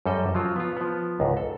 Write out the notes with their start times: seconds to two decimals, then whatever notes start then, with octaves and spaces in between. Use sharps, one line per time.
0.06 F#2 G3 A4 D#5
0.35 F3 F#3 F4
0.56 B3 F4
0.77 F3 B3
1.20 C#2 G#2
1.37 A4